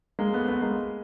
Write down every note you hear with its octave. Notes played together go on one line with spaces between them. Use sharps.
G#3 A#3
A3 B3
A3 B3
G#3 A#3